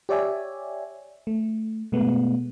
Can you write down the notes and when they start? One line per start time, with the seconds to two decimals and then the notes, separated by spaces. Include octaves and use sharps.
0.09 G4 C#5 D5 E5 G#5
1.27 A3
1.92 B2 G#3 A3 B3